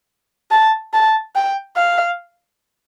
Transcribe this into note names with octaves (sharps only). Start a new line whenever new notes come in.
A5
A5
G5
F5